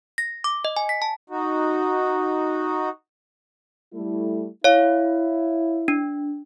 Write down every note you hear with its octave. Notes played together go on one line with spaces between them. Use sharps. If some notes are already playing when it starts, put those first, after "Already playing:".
A#6
D6
D#5
G#5
B6
A5
D#4 F#4
G3 A3 E4
E4 C#5 F5
D4